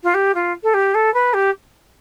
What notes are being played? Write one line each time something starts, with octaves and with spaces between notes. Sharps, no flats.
F4
G4
F4
A4
G4
A4
B4
G4